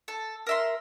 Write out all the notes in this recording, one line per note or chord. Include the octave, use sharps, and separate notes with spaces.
A4
A#4 E5 C6